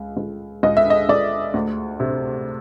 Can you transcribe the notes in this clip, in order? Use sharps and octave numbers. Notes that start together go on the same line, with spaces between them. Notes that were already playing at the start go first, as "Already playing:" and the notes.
Already playing: C#2
C#2
C#2 D#5
E5
D#5
C#2 D5
D2
C3